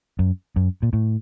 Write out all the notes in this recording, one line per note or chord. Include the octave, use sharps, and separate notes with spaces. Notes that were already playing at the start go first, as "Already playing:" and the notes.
F#2
F#2
A#2
A2